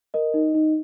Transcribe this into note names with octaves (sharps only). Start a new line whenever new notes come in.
A#4 D#5
D#4
D#4